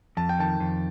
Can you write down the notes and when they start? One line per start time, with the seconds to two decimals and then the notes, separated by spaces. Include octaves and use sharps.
0.17 F2 A5
0.29 G5
0.39 D#3 A5
0.60 F2